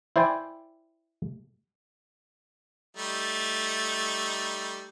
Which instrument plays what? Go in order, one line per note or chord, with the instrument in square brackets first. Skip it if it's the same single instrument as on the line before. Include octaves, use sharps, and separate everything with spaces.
[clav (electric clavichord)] E4 C5 D5 G5 G#5
[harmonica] G3 A3 D#4